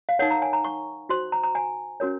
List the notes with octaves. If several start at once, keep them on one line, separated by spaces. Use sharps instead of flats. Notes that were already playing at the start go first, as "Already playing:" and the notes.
F5
D#4 A#4 C#5 F#5
A#5
G#5
A#5
C#6
F#4 C5 C6
A#5
A#5
G#5
C#4 F#4 A#4 C#5